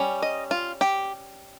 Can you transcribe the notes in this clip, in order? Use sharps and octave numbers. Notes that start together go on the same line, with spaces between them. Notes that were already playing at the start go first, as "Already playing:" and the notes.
Already playing: G3 C#4
D#5
F4
G4